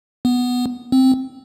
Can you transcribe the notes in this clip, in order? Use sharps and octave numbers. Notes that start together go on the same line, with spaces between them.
B3
C4